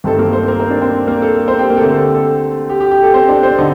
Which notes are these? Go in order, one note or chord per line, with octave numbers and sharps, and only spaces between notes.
G2 D#3 A3 C4 A4
A#3 A#4
C4 C5
A#3 A#4
C4 C5
D4 D5
C4 C5
A#3 A#4
A4
A4
C4 C5
G4 G5
A#3 A#4
A4
D3 A3 C4 G4
A4
A4
G4
G4
G4
A4
C4 C5
D4 D5
C4 C5
D3 D#4 D#5